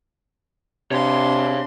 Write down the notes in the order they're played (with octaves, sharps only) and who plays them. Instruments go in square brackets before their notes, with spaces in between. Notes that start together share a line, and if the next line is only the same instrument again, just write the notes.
[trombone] C3 [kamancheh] D4 C6 [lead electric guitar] C#5 F5